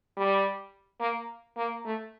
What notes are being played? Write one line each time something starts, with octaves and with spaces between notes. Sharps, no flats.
G3
A#3
A#3
A3